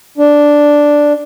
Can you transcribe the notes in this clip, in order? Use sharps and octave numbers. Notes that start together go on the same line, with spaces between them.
D4